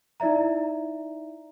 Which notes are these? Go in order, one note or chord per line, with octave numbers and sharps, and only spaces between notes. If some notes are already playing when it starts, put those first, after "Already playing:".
D#4 E4 D5 E5 A#5